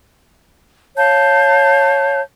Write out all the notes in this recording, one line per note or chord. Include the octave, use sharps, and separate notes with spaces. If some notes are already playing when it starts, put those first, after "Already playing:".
C#5 F5 A5 G6